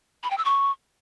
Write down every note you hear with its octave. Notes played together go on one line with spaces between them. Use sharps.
B5
G5
E6
C#6